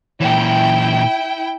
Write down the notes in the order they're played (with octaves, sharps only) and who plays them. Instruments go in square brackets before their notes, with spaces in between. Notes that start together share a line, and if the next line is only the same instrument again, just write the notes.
[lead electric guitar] A#2 E3 [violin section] E4 G5